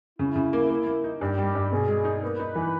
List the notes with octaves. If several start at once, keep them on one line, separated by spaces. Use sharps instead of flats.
C#3 E4
C#3
A#3
A#3
A#3
D#4
G2 G4
G3
G2
B2 G#4
G#3
D#4
A#3 B4
D#4
E3